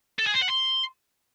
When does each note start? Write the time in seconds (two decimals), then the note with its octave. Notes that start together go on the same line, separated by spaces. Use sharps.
0.19 A4
0.26 G#4
0.34 C5
0.41 F#5
0.49 C6